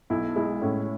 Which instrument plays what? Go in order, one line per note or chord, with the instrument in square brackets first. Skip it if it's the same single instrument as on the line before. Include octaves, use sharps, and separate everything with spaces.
[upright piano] B1 [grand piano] E4
[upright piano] G#3 [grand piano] E4
[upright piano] A2 [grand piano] C#4